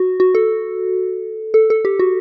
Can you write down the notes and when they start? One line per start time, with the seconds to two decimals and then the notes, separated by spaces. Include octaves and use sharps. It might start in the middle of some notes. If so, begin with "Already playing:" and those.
Already playing: F#4
0.20 F#4
0.35 A4
1.54 A4
1.70 A4
1.85 G4
1.99 F#4